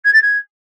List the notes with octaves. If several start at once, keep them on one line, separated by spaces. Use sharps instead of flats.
G#6
A6
G#6